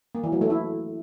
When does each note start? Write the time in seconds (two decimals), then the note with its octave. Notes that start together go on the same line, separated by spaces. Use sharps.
0.15 A#3
0.23 E3
0.32 F#3
0.41 A3
0.50 E4